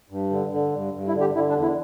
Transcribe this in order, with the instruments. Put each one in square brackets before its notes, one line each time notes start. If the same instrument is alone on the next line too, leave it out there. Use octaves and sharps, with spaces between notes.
[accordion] G2
D3
D3
G2
G2
E4
D3
G4
D3 E4
D4
E2
E4